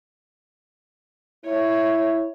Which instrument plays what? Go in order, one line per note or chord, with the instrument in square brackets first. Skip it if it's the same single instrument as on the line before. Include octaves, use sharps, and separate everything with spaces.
[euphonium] E4 [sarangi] C#5